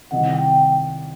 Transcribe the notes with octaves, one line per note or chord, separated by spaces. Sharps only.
C2 C3 D#3 F#5
G5